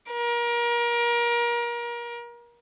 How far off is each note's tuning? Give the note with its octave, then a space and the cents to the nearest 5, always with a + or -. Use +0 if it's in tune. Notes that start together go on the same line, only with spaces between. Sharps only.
A#4 +30